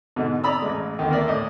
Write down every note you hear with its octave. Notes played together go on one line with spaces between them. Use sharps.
G#2 B2 D3
D5 A#5 B5 D#6 E6
A1 G#3
D2 D3 D#3
A#3 A#4 D5 E5
A2 D#5